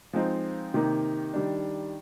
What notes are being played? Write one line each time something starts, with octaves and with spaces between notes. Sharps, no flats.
F3 G#3 C4 D#4
C3 D#3 A#3 D#4
D#3 G3 D4